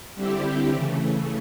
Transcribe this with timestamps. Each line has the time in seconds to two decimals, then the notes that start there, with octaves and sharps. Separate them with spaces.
0.15 D3 G3 C4 E4 G4
0.72 C#3 E3 A3